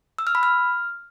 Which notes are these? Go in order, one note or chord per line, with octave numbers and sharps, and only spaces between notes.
E6
F6
B5
F6